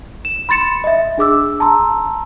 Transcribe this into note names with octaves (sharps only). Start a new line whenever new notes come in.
E7
B5 C6 A6 C#7 E7
D#5 E5
D4 G#4 D6 E6
A5 A#5 C6 E6